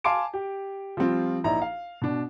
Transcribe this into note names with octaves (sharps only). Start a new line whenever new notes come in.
F5 G#5 A5 C6 D6 D7
G4
F3 G3 C4 F4
A#1 D#4 E4 A#5
F5
B2 D4